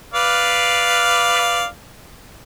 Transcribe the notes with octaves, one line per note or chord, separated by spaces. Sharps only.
B4 D5 F5